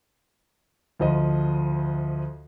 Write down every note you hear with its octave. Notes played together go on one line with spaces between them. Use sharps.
D2 F3 D#5